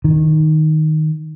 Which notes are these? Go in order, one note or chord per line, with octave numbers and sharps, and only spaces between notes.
D#3